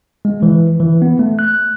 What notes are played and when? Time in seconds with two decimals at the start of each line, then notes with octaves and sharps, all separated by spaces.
0.25 G#3
0.43 E3
0.80 E3
1.02 B3
1.19 A3
1.39 F#6